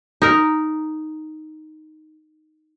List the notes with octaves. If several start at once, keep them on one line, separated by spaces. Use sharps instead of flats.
D#4 A#4